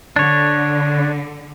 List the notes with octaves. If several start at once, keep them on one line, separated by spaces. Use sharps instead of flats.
D3 D4 C#5